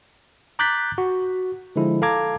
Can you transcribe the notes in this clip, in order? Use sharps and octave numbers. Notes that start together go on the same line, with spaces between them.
A#5 D6 F#6 G6 A6 B6
F#4
D3 F3 G#3 E4
A4 F5 A5 A#5 D6 G#6